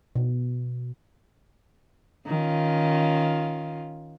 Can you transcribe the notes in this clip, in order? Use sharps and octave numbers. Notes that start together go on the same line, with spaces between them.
B2
D#3 C#4 F4